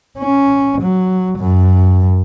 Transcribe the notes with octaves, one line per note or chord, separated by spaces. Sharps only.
C#4
F#3
F#2